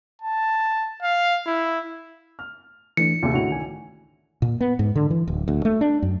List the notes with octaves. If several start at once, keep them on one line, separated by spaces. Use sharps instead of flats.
A5
F5
E4
F6
E3 A3 D4 C#7
D#2 C3 F4 G#4
A1 D3 E4 F#4 F7
C2 D#3 G#5
A#2
B3
G#2
D3
E3
D1
D2
A3
D4
F#2